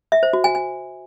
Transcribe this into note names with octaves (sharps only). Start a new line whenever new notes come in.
E5
C5
F#4
G#5
G#5